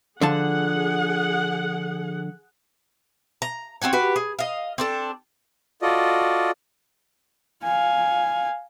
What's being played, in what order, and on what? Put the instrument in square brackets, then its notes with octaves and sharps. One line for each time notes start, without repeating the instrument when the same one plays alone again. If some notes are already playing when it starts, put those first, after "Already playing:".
[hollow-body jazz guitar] D3 F3 A5 [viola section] G#4 F#5
[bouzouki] A#5
C4 D#4 F#4 C#5
F#4 G4 B4
G#4
D#5 F5
C4 D4 A4
[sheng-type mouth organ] F4 F#4 A4 D5 D#5
[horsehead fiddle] F5 G#5